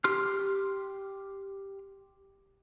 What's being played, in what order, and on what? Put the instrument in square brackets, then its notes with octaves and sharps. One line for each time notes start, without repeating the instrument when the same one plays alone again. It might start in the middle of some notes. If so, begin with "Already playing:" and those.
[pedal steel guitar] G4 C6 F6